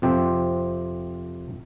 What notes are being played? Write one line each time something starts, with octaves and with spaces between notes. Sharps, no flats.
F2 C3 F3 C4 G4